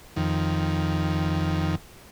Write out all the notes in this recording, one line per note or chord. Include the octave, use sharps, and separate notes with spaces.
F2 D#3